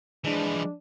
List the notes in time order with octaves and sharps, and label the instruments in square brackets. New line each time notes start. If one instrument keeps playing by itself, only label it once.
[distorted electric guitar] E3 F3 [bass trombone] G#3 [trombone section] D4